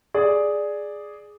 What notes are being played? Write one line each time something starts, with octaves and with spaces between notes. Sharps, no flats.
G#4 D5